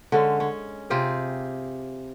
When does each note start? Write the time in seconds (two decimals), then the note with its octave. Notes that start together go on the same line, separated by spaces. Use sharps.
0.12 D3 G#3 C#4
0.40 C#4
0.90 C3 F4 G4 G#4